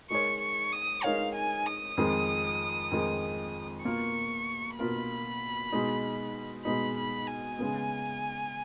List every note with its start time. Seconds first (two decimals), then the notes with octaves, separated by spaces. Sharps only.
0.11 G#3 D#4 A#4 C#5 C#6
0.42 C#6
0.73 D#6
1.04 G#3 D#4 A#4 C#5 F5
1.35 G#5
1.66 D#6
1.97 F2 D#3 G#3
2.91 F2 D#3 G#3
3.85 B2 A#3 F4 A#4 C#6
4.78 B2 A#3 F4 A#4 B5
5.72 B2 G#3 D#4
6.65 B2 G#3 D#4 B5
6.97 B5
7.28 G#5
7.59 C#3 G#3 B3